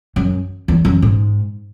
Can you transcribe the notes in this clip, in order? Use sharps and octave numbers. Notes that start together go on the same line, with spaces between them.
F#2
E2
F#2
G#2